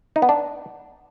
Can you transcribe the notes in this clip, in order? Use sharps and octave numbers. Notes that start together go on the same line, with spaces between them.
D#4
B3
D4